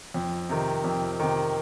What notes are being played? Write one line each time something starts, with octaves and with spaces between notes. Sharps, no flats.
F2
C3 D#3
F2
C3 D#3